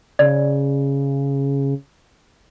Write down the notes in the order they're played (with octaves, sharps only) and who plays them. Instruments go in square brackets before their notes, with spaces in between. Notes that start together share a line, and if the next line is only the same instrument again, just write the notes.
[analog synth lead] C#3 [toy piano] D5